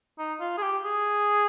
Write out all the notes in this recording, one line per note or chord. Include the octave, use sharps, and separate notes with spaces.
D#4
F4
G#4
G4
G#4